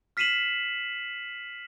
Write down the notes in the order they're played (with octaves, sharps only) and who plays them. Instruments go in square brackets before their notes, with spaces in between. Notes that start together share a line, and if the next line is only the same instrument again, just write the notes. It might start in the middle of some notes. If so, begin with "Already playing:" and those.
[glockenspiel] F6 B6 C7 D#7 E7 F#7